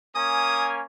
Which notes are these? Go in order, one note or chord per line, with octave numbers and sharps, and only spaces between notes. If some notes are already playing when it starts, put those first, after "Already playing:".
A#3 C#4 G#5 D#6